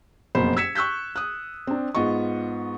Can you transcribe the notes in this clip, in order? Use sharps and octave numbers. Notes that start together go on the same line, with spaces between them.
F#1 F2 B2 A#3 C5 B5
E6 G#6 B6 C#7 E7
C#6 E6 F#6 G6 B6
D#6 F#6
C4 D4
G#2 B3 F4 D#5 C#6